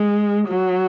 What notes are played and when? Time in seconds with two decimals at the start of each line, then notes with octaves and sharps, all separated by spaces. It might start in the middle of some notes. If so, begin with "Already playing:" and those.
Already playing: G#3
0.48 F#3